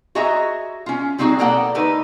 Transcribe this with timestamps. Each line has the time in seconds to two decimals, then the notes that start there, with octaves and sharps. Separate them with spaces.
0.15 F#4 G#4 D#5 E5 A#5
0.86 C#4 F4
1.18 G3 C4 D#4 F#4 G#4
1.39 B2 A#3 A4 D5 F#5 G5
1.75 D3 A3 D#4 A#4 B4